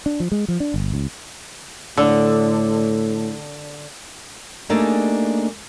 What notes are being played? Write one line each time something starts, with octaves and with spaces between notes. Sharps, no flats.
D4
F3
G#3
F3
D4
G1
C#2
A2 D3
A3 A#3 D4 D#4 G4 G#4